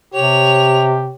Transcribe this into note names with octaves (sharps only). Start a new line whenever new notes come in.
C3 G4 C#5 F7